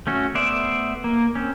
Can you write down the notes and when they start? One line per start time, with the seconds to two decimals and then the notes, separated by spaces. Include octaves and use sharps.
0.07 A3 C#4 F#4
0.35 A3 B3 C5 D5 E5
1.04 A#3
1.35 C4 C#4